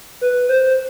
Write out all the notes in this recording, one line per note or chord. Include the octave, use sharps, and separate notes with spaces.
B4
C5